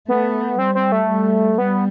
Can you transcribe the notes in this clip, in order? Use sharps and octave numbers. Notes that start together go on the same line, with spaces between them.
A3 B3
G3 C4
C4
A3
G3
G3 B3